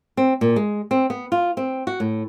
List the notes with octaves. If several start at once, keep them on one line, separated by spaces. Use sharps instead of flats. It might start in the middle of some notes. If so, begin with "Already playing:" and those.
C4
A#2
G#3
C4
B3
F4
C4
F#4
A2